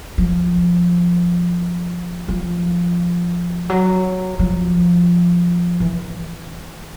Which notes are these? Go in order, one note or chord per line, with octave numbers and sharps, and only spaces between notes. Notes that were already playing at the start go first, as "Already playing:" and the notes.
F3
F3
F#3
F3
E3